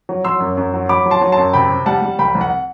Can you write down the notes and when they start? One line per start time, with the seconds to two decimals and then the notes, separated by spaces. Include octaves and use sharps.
0.09 F#3
0.24 F#3 C6 E6
0.40 F#2
0.57 F#2
0.74 F#3
0.89 F#3 B5 D6
1.06 F#3
1.11 A5 C6
1.21 F#3
1.32 A5 C6
1.38 F#2
1.53 C3 G5 B5
1.70 C3
1.86 G3 F#5 A5
2.02 G3
2.19 C2 G5 B5
2.35 C2
2.41 F#5